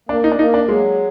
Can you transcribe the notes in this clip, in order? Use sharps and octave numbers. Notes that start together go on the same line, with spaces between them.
A#3 D4
D#4
D4
A#3 D#4
D4
F#3 G#3